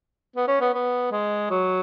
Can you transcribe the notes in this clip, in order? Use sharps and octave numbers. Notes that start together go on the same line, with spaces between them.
B3
C#4
B3
B3
G#3
F#3